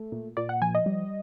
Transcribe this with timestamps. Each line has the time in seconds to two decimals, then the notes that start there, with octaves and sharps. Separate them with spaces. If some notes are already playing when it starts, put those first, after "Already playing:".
Already playing: A3
0.12 A#2
0.37 A#2 D5
0.49 F#5
0.62 F3 G#5
0.75 D#5
0.86 G3